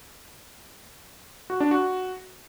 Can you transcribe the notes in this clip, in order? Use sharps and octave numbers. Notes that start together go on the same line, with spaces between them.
F#4
D4
F#4